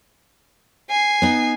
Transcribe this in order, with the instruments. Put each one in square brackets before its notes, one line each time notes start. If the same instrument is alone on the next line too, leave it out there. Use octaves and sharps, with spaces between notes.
[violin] G#5 C7
[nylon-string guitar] B3 D#4